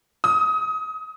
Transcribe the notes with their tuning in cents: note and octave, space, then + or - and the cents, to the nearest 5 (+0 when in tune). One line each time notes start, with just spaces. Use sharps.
D#6 +30